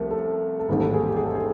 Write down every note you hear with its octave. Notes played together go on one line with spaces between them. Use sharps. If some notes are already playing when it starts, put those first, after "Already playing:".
Already playing: C2 F3 A3 A#4
A4
A4
A1 G#2 D#3 G3 A#3 G#4
A4
G#4
G4
G#4
A4
G#4